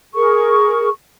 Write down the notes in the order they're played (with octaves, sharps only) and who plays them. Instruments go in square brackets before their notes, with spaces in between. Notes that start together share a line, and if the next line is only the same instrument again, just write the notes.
[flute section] G#4 A#4 C#6